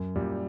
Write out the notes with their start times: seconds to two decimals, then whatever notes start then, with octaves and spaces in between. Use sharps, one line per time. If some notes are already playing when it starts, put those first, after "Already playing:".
Already playing: F#2
0.15 F#2 A#2 G3